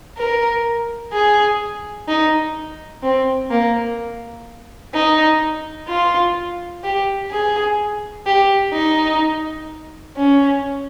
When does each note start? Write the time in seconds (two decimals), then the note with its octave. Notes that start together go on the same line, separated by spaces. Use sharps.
0.18 A#4
1.13 G#4
2.08 D#4
3.03 C4
3.50 A#3
4.94 D#4
5.89 F4
6.84 G4
7.31 G#4
8.26 G4
8.73 D#4
10.17 C#4